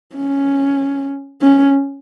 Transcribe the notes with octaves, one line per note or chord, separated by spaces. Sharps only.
C#4
C#4